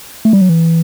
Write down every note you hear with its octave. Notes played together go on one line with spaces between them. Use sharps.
A3
G3
F#3
E3